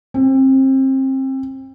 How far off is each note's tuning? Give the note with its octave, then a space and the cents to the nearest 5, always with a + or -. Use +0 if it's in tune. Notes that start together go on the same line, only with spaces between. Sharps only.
C4 +30